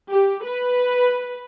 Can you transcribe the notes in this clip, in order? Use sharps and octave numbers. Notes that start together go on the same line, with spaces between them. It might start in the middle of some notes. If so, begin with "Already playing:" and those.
G4
B4